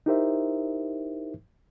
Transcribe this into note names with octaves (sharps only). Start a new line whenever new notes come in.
D#4 E4 G4 A#4 C5 E5